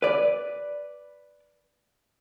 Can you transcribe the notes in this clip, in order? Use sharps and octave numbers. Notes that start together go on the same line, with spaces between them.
B4 D5